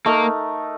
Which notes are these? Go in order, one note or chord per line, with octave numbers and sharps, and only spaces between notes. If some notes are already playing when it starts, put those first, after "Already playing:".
A3 A#3 D#4 A#4